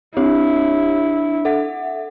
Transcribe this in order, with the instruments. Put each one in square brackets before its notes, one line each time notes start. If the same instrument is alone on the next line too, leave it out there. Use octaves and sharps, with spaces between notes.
[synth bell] C4 G4 C#5 [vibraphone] D4 [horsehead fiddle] E4
[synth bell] A4 E5 F#5